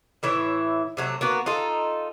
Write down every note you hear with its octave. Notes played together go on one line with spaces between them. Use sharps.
A2 E3 E4 C#5
C3 F#3 A3
A#3 B3 F#4
D#4 F4 A4